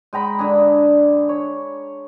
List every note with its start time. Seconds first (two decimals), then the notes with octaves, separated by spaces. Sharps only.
0.13 G#3 G5 A#5 B5
0.39 D3 D4 G#4
1.29 C#5